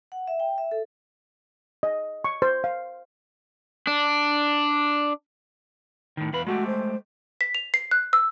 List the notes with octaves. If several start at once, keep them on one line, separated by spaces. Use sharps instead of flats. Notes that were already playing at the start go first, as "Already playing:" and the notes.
F#5
E5
G5
E5
A4
D#5
C#6
C5
F5
D4
A2 D#3
E2 B4 F5 B5
G#3 A3 F#4 G4
C5
B6
F7
C7
F#6
E6